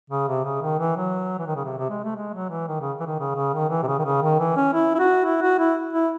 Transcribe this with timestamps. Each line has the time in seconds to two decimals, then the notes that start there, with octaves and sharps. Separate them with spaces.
0.10 C#3
0.28 C3
0.44 C#3
0.62 D#3
0.80 E3
0.97 F#3
1.39 E3
1.47 D#3
1.56 C#3
1.65 C3
1.78 C3
1.90 G#3
2.04 A3
2.16 G#3
2.34 F#3
2.50 E3
2.68 D#3
2.80 C#3
3.00 E3
3.06 D#3
3.20 C#3
3.36 C#3
3.54 D#3
3.70 E3
3.83 C3
3.88 C#3
3.99 D#3
4.05 C#3
4.22 D#3
4.40 E3
4.56 C#4
4.74 E4
4.95 E4
4.99 F#4
5.25 E4
5.42 F#4
5.59 E4
5.93 E4